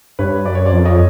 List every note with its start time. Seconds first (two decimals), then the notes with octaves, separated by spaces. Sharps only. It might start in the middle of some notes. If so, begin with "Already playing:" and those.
0.19 G2 B4 C#5
0.45 F#2 D5
0.55 C#5
0.65 C5 D5
0.71 F2
0.85 C#5 D#5